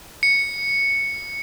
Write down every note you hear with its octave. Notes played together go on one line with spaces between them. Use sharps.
C#7